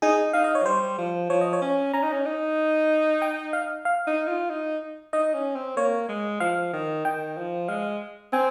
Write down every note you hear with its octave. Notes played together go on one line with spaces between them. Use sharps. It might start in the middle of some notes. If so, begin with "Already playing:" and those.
D#4 G#4
D#4 F5
D#5
C#5
F3
G3 C5
F3
F3 C#5
D#5
C#5
C#4
C#4 A#5
D#4
C#4
D#4
G5
F5
F5
D#4
F4
D#4
D#4 D#5
C#4
C4
A#3 C#5
G#3
F3 F5
D#3
D#3 G5
F3
G#3 F5
C4 G#5